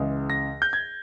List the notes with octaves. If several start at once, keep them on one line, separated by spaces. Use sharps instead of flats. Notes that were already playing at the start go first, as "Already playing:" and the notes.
Already playing: C#2 C#3 E3 G#3
A#6
G6
G#6